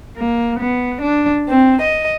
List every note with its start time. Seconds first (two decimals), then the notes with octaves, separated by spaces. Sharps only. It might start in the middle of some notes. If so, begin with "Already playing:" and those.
0.17 A#3
0.60 B3
1.02 D4
1.47 C4
1.82 D#5